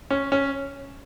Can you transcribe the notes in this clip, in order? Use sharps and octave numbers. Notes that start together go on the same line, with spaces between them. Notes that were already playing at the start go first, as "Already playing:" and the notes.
C#4
C#4